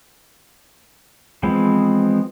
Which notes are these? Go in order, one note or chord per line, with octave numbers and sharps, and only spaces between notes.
E3 F3 G#3 B3 C4